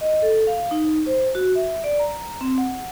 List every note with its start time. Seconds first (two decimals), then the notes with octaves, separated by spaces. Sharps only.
0.01 D#5
0.22 A4
0.47 F5
0.71 D#4
1.06 C5
1.35 F#4
1.55 E5
1.84 D5
1.99 A#5
2.41 C4
2.58 F#5